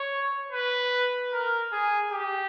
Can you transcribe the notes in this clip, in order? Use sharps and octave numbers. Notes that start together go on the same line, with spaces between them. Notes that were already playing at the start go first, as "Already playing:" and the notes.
Already playing: C#5
B4
A#4
G#4
G4